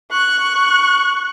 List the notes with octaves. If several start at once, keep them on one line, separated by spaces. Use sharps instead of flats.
C#6 F#6